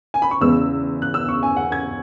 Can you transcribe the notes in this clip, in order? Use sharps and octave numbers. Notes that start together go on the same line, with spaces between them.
G#5
B5
C#6
E2 C#3 G#3 B3 E6
F#6
E6
C#6
G#5
F#5
G#6